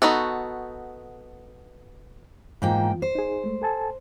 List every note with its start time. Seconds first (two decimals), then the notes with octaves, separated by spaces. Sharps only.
0.02 B3 D#4 F#4 A4
2.62 G#2 E3 A#3 F4 G5
3.02 C5
3.15 D#4 G#4
3.44 G#3 A3
3.62 A4 G#5 A5